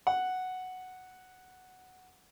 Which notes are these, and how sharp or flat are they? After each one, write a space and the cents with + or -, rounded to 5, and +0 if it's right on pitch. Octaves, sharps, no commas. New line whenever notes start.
F#5 +0